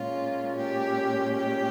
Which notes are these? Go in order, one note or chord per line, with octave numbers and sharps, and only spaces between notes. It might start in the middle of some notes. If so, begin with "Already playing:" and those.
Already playing: A#2 G#3 C#4 F4
G4
G4